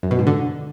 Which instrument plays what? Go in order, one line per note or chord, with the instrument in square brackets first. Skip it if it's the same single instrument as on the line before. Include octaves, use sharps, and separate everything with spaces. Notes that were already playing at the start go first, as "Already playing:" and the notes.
[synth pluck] F#2
B2
G#2
D3